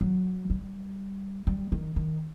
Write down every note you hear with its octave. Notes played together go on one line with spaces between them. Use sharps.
F#3
G3
G3
D#3
D#3